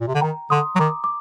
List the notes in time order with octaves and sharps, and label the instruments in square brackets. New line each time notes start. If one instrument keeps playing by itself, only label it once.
[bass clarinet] A#2
C3
D3
[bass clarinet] D#3 [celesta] G5 A#5
[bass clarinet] D3 [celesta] C6 D#6
[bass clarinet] F#3
[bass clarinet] D#3 [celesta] A#5 D6
[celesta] D6